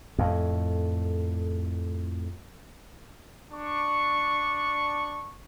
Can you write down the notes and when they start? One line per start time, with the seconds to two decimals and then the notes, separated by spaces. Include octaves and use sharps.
0.18 F2 A2
3.52 D4 C#6